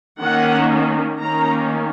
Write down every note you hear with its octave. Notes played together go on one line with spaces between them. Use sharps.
D#3 A#3 C#4 F#5
D#3 A#3 C#4 A#5